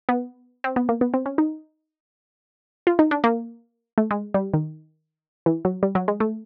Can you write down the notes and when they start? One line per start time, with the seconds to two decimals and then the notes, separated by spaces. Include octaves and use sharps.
0.09 B3
0.64 C4
0.76 B3
0.89 A#3
1.01 B3
1.14 C4
1.26 C#4
1.38 D#4
2.87 F4
2.99 D#4
3.11 D4
3.24 A#3
3.98 A3
4.11 G#3
4.34 G3
4.54 D#3
5.46 E3
5.65 F#3
5.83 G3
5.95 F#3
6.08 G#3
6.20 A3